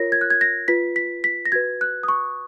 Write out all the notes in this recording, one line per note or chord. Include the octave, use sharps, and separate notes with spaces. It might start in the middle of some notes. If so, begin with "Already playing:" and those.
Already playing: F4 A#4 C#5 A#6
G#6
F#6
G#6
A#6
F4 B4 B6
B6
B6
A#6
F#4 B4 G#6
F#6
D#6
C#6